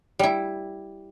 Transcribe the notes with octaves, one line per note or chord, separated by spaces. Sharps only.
G3 E4